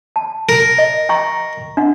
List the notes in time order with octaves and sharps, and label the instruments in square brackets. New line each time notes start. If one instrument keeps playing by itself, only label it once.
[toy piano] A5
[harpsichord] A#4
[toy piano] D#5
G5 A#5 C#6
D4 F#5